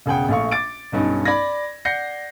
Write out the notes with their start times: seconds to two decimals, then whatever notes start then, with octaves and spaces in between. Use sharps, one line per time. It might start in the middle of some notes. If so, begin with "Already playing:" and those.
0.06 E1 C#3 G#4 F#5 G5
0.28 A#1 A3 F5 C#6
0.51 D6 A6 D7
0.92 B1 G2 C#4 D#4
1.25 D5 B5 G#6 A#6
1.85 D5 F#5 G6 A#6 C7 C#7